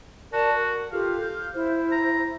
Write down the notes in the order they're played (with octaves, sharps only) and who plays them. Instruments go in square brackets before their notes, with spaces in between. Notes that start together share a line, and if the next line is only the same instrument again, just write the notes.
[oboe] F#4 [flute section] A#4 D5 A5
[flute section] A#4
[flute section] F4 G4 A4 [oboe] F5
[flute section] G6
E4 C5
[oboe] A#5